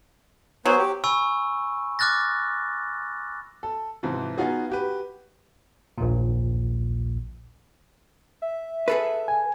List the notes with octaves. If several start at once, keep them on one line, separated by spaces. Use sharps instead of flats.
F#3 B3 C5 G#5
G4
G#5 B5 C#6 E6
D6 F6 F#6 A6 A#6
A4
G#2 C3 E3 F3
B3 D#4 F4 F#4 G#4
F#4 G4 B4
A#1 D#2 A#2
E5
G#4 A4 B4
G#5